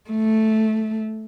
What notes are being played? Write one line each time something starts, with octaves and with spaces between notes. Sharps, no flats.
A3